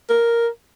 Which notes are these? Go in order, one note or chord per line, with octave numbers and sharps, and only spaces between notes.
A#4